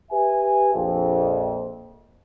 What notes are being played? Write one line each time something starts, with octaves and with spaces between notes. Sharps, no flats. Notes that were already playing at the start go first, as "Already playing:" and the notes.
G4 B4 E5 G#5
A#1 F2